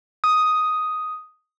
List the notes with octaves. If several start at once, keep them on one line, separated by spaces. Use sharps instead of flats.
D#6